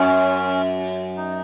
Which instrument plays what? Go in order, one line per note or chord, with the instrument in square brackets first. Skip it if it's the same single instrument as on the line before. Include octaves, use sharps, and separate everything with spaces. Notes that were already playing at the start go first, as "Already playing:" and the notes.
Already playing: [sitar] F#2 [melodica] C#4
[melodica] D#4